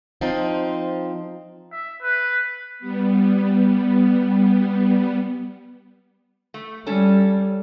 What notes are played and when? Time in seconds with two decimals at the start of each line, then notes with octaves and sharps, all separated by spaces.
0.21 F3 C4 D#4
1.72 E5
2.02 B4
2.79 G3 B3
6.54 A3
6.87 G3 C#4 A4